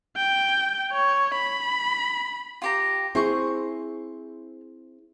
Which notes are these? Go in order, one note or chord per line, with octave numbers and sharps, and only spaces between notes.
G5
C#5
B5
F4 G4 A#5
C4 E4 G#4 C5 C#6